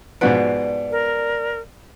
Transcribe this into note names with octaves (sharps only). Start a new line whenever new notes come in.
G#2 B2 F3 B4 D5 F#5
A#4